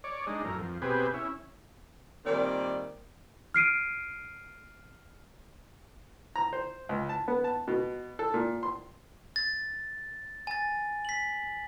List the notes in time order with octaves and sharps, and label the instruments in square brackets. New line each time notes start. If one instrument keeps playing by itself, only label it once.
[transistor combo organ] C#5 D5
G#3 D4 D#4
F#2 A2 A#4
F2
B2 C4 G4 G#4 B4
C#4 E4
[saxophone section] A#2 D#3 G3 C4 D5
[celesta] F6 C7 D7 D#7
[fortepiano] A#5
C5
C#2
A5
B3
A5
B2
A4
A#2
C6
[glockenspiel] A6
G#5 A6
B6 F#7